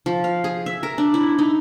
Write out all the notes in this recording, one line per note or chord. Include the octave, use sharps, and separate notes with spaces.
F3
F5
G#4
E5
A#4
D4
E4
D#4